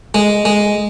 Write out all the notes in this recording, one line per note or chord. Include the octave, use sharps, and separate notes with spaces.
G#3
G#3